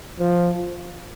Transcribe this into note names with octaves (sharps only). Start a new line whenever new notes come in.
F3